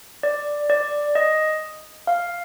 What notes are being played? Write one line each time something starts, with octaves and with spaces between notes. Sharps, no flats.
D5
D5
D#5
F5